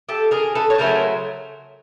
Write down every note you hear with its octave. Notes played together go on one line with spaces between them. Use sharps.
G4 A4
G#4 A#4
A4 B4
C#5
C#3 F#3 A3 A#4 C5